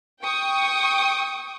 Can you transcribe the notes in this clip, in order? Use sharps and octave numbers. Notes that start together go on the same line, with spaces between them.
G5 C#6 D#6